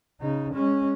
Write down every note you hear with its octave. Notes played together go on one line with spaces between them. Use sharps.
C#3 D#4
G#3 C#4